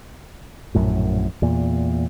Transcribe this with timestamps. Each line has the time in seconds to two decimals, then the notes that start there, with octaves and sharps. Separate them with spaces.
0.75 A#1 F#2 A2
1.42 E2 A#2